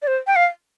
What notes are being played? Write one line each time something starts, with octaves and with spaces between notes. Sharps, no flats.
D5
C5
G5
F5